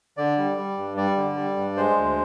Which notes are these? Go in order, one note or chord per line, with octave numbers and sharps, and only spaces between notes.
D3 D5
G3
G3
G2
G3 D5
D3
G3
G2
G#3 C5
D2